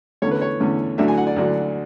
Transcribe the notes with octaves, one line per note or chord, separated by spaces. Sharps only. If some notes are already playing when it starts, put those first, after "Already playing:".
E2 D3 A3 C#4 C#5
B4
C#5
E2 D3 A3 C#4
D2 D3 F#3 A3 D4 E5
G#5
F#5
D5
D2 D3 F#3 A3 D4